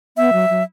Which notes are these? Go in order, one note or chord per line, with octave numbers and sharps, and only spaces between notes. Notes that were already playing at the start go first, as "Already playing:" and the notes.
B3 E5
F#3
F#3